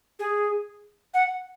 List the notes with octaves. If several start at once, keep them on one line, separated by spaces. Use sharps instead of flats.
G#4
F#5